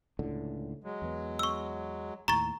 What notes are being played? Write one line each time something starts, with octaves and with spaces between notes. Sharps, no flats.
C#2 A2 D3
F#3 G#3
E2 B3
C#6 E6
D#2 A2 A#5 C#6 A6